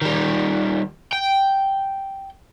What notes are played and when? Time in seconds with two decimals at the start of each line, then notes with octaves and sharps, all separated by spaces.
0.02 D#3 G3
1.13 G5